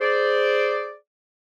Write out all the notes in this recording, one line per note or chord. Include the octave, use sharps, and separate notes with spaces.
G#4 C5 D5